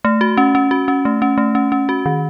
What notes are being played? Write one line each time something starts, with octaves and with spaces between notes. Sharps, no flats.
A3
F#4
C#4
C#4
F#4
C#4
A3
C#4
A3
C#4
C#4
F#4
D#3